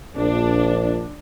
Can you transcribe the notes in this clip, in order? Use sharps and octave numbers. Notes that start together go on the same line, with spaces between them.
A#1 D4